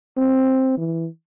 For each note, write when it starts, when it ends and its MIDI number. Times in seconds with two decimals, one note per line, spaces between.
0.17 0.73 60
0.78 1.07 52